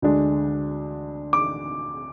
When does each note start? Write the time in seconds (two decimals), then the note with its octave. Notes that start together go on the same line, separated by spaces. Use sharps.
0.02 D2 D3 G#3 D4
1.33 D6